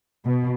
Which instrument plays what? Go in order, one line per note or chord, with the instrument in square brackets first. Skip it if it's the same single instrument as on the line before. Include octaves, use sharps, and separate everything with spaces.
[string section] B2